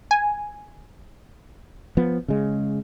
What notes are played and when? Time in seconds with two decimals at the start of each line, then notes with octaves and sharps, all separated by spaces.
0.11 G#5
1.97 F3 B3
2.28 C#3 G#3